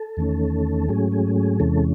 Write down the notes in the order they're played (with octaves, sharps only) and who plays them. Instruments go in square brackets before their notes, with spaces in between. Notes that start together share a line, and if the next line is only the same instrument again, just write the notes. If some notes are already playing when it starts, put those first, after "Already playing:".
Already playing: [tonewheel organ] A4
E2 D#3 A3 C#4
G#2 F#3 A3 C#4 G#4
G#4
G#4
E2 C3 E3 G#3 C#4 A4